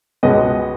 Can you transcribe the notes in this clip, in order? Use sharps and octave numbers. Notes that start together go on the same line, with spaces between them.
C#2 B2 G#3 B3 D#5